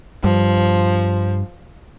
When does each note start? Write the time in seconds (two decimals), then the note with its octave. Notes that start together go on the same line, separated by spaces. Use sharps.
0.24 G2 F3